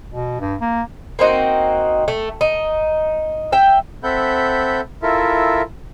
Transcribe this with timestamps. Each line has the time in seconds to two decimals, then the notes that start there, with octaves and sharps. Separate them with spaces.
0.10 B2
0.41 G2
0.61 A#3
1.19 A#3 C4 D#4 F#4
2.08 A3
2.41 D#4
3.52 E5 G5
4.03 C4 A4 E5 F#5 B5 G6
5.03 E4 F4 A4 A#4 E5